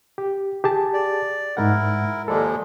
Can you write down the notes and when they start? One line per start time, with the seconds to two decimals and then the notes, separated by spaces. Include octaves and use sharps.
0.18 G4
0.64 G4 G#4 A5
0.93 D5
1.57 G#2 G#3 E4 A#4 F#5
2.28 D#2 F3 G#3 A4 D5